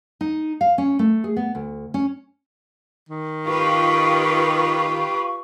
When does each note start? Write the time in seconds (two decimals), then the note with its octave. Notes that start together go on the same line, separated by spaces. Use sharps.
0.21 D#4
0.61 F5
0.78 C#4
0.99 A3
1.24 G#4
1.37 B3
1.55 D2
1.94 C#4
3.09 D#3
3.46 F4 G4 B4 C#6